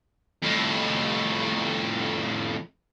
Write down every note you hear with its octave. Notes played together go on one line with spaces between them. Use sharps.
F2 A2